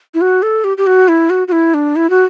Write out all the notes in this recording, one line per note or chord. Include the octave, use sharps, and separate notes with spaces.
E4
F#4
A4
G4
G4
F#4
E4
F#4
F#4
E4
D4
E4
F#4